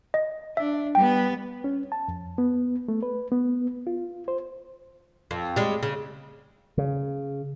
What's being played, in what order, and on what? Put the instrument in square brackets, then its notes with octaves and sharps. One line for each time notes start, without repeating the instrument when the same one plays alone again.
[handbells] D#5
[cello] D4 [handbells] E5
[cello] G3 B3 [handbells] G5
[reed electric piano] C#4
A5
F2
B3
A3
B4
B3
F4
C5
[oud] F2
G3 G#3
C#3
[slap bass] C#3